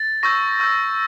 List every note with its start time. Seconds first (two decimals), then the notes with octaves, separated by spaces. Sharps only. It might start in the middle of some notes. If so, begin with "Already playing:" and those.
Already playing: A6
0.23 C#6 E6 G6 A#6
0.60 C#6 E6 G6